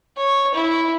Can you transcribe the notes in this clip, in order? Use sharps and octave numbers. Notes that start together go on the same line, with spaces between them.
C#5
E4